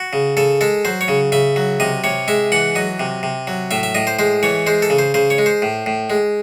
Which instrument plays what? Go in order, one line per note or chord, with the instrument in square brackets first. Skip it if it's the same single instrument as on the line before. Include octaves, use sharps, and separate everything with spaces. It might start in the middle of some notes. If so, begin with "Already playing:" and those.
Already playing: [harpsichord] F#4
C#3
C#3 A4
G#3 A4
F#3 C5
C#5
C#3
C#3 E5
F#3
C3 D#5
C3 C#5
G#3 E5
E3 F#5
F#3 D#5
C3
C3
F#3
A2 E5
E5
A2 D#5
C5
G#3 C5
E3 C#5
G#3 C5
A4
C#3
C5
C#3 C5
C#5
G#3
C5
A2
A2
G#3